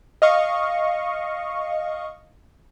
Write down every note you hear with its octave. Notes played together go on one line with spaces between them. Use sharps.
D#5 F5 C#6